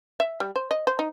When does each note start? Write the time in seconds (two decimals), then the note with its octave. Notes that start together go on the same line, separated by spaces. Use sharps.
0.20 E5
0.40 G3
0.56 C5
0.71 D#5
0.87 C5
0.99 D#4